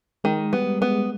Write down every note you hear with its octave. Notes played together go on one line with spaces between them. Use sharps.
D#3 G#3
G3 B3
G#3 B3